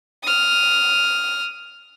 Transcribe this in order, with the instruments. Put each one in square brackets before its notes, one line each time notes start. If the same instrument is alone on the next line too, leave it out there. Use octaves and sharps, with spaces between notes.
[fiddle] D#6 F6